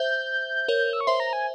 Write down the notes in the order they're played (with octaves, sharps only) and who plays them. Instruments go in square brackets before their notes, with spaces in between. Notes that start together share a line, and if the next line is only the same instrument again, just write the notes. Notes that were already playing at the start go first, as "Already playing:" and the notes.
Already playing: [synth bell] C5 E5 [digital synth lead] G6
[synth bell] A#4 C#5
[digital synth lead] E6
C#6
[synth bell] C5 E5 [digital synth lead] C6
[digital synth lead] A#5
G#5